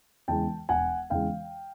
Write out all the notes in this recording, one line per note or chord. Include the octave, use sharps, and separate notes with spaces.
E2 C#3 E3 G#3 G5 A5
E1 F#5 G#5
E2 C#3 E3 G#3 F5 G5